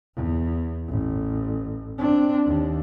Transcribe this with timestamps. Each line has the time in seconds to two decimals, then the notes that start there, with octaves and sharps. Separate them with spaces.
0.16 E2
0.88 A1
1.98 C4 D4
2.46 D#2